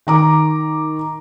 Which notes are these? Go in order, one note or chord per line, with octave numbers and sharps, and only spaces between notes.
D#3 A#5 D6